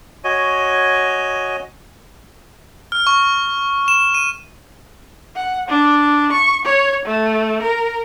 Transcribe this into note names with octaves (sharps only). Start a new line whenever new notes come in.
F#4 C#5 D#5 G#5
F6
C#6
E7
D#7
F#5
D4
C#6
C#5
A3
A#4